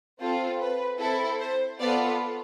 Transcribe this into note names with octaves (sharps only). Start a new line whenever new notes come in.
C4 F4 A4 C5
B4
C4 E4 A4
C5
B3 F4 A4 D5